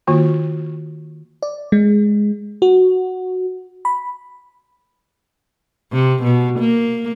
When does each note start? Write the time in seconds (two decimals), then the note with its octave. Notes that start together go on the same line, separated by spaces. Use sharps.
0.07 D#3 A#3 F4 F#4
1.43 D5
1.72 G#3
2.62 F#4
3.85 B5
5.93 C3
6.24 B2
6.60 A#3